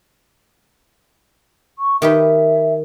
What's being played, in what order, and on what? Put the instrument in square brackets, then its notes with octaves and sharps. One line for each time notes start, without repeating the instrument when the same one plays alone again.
[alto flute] C#6
[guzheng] D#3 G4 B4 [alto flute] E5